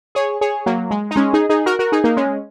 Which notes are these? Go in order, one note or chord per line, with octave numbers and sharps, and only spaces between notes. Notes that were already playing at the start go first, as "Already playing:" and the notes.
G#4 C#5
G#4 C#5
F#3 A#3
G#3
D#4
G#3 C#4
D#4 G#4
D#4 G#4
F#4 A#4
F#4 A#4
D#4 G#4
A#3 D#4
G#3 C#4